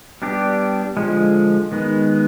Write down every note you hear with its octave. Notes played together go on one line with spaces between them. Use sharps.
G3 B3 D4 G4
D3 F3 G#3
D#3 G#3 B3